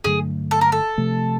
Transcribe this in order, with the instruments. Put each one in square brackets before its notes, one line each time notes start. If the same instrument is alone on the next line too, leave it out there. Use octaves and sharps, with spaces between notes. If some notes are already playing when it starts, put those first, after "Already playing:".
[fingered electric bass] G2 D3 F#3 A3 [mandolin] G#4
[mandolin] A4
A#4
A4
[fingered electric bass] C3 F3 A3